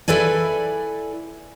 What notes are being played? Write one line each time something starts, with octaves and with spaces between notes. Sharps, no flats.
E4 A4 B4 D5 G#5